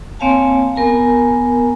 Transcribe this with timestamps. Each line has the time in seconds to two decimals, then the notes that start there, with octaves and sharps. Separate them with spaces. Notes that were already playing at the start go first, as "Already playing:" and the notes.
0.19 A#3 C4 C#5 F5 G#5 A5
0.75 B3 A#4 G#5 A#5